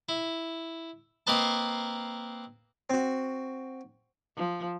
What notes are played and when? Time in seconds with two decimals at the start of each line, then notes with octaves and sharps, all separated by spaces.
0.09 E4
1.27 A#3 C4 A#4 B4 D#5 A5
2.90 C4 F#4
4.36 F3